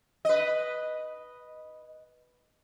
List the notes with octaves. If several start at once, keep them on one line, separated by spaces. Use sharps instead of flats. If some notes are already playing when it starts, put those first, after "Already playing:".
B4 D#5